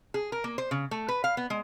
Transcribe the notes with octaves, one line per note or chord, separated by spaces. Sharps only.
G#4
A#4
A#3
C5
C#3
A3
B4
F5
B3
G#3